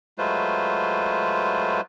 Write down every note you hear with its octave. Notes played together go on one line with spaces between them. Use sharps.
F#3 G#3 A3 F4 B4 C5